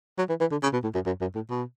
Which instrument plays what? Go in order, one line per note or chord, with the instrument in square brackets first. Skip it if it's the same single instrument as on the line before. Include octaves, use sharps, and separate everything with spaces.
[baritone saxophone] F#3
E3
E3
D3
C#3
B2
A2
F#2
F#2
F#2
A2
B2